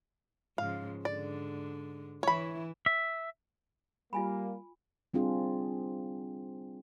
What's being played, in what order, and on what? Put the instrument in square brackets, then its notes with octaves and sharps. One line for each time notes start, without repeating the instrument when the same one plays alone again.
[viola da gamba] G#2 C#3 F3 [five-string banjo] F5
[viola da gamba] G#2 D3 [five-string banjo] D5
[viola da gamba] E3 E4 [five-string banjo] C#5 B5
[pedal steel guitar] E5
[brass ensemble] G3 A#3 [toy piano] F4 G#5 B5
[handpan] G3 C4 D4 F4 G#4